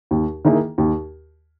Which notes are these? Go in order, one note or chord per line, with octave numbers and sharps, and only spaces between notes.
D#2
D#3 A#3 E4 G#4
D#2